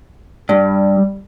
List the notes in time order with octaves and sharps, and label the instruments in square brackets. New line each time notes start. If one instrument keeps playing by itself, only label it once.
[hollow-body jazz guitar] G2 [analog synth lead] G3